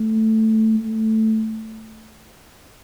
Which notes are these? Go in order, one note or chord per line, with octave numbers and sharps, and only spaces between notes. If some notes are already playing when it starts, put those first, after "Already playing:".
Already playing: A3
A3